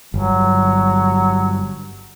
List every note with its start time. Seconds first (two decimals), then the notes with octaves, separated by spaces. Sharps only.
0.14 G1 F#3